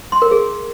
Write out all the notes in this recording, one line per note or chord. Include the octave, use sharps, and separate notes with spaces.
C6
A#4
G#4